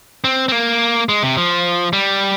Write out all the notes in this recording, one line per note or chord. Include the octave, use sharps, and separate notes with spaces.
C4
C4
A#3
G#3
C3
F3
G3